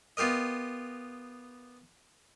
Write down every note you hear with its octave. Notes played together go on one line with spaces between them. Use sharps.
B3 F4 G4 A#4 D#5